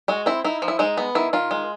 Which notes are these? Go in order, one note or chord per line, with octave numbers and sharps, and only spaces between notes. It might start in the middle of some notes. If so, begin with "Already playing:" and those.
G#3 F#4
C4 E4
D#4 E4
F3
E4
G#3 D#4
B3
D#3 E4
D#3 F4
G#3